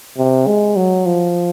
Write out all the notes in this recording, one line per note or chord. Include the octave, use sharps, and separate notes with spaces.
C3
G#3
F#3
F3